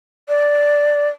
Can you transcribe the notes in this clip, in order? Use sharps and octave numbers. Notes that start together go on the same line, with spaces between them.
D5